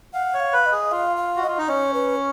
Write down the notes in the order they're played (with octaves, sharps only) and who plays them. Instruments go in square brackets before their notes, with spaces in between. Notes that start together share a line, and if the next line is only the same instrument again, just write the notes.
[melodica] F5 [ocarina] F#5
[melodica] C#5
[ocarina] F5
[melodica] B4
[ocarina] D#5
[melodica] G#4
[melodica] F4 [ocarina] F5
[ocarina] F5
[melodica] F#4
[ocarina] D#5
[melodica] F4
D#4
[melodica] C#4 [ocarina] C#5
[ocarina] B4